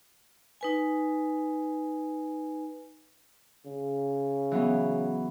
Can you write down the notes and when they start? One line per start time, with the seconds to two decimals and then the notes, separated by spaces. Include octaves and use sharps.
0.61 D#4 B4 G#5
3.67 C#3
4.52 E3 F#3 B3